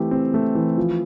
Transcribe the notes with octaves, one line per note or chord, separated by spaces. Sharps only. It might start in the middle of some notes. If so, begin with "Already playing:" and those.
Already playing: E3 A3 C4 G4
C4
A3
E3
F3